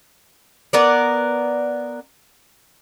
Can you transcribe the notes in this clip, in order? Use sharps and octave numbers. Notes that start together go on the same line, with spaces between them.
B3 A#4 D5